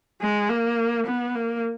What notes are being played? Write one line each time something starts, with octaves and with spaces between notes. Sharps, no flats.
G#3
A#3
B3
A#3